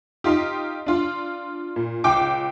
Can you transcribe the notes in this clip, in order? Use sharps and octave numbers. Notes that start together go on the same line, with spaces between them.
D#4 F4 G4
D4 F4
A#2
C#2 G5 D6